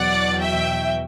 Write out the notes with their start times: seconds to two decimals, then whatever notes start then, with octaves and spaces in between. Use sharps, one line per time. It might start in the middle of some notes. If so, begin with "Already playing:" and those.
Already playing: E2 B2 F#3 D5 F#5
0.40 E5 G5